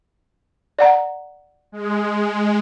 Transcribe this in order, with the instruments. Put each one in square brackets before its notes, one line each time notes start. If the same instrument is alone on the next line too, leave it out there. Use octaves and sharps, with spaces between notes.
[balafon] D5 F#5 A#5
[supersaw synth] G#3